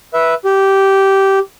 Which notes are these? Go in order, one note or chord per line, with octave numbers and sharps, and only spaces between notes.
B4 E5
G4